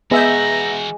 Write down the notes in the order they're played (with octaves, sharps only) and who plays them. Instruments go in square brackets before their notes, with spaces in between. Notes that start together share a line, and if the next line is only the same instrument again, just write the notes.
[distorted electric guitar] E3 F#4 [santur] G#3 [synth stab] B3 E5 G6 [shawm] A#5